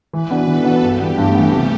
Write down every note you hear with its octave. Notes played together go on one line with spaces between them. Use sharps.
E3 B4
B3 D4 F#4
E3 A4
B3 D4 F#4
G2 G4
E3 B3
G2 A3
E3 B3
C3